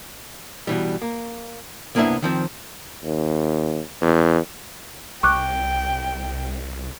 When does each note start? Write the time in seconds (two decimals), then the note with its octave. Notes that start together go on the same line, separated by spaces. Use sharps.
0.67 B2 E3 G3
1.02 A#3
1.95 C2 A#3 B3 D4 E4 E5
2.22 D#3 F3 C4
3.04 D#2
4.01 E2
5.23 C2 G5 C#6 D6 F#6